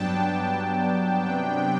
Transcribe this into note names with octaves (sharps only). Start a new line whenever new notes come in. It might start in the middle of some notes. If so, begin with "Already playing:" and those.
Already playing: G2 F#3 B3 D4 G5 A5
C3 F#3 B3 D4 G5